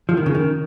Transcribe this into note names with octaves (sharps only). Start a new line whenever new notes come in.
F3
D#3
C#3
D#3